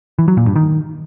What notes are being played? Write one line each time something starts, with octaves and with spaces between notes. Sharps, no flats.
E3
F#3
A#2
G2
D#3